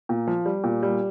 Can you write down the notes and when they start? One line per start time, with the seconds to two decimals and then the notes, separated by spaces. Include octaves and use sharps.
0.09 A#2
0.27 F3
0.46 G3
0.64 A#2
0.83 G3